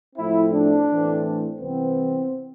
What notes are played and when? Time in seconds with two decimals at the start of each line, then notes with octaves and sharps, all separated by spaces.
0.16 A2 F3 A3 C4 E4
0.51 D4
0.88 A2 E3 A3 C4
1.60 C2 C3 E3 B3 C4